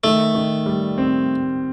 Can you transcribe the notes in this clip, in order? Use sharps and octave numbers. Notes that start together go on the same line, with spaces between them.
D#3 A3
D#3
G3
C4